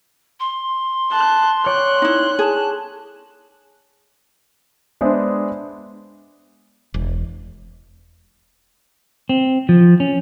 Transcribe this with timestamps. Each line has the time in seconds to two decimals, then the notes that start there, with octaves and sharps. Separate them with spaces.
0.39 C6
1.11 A5 F#6
1.66 C#5 D5 G5 F#6
2.02 D#4 E4
2.39 G#4 A5
5.01 G#3 B3 D4 G#4 C5 E5
6.94 E1
9.29 C4
9.69 F3
10.00 C#4